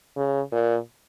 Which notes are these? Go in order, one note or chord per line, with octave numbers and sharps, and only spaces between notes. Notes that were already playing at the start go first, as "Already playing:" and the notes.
C#3
A#2